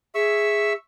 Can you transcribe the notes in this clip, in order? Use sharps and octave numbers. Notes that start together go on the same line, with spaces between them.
G#4 E5 C#6 E6